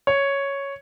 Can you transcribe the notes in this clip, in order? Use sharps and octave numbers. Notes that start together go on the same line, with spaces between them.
C#5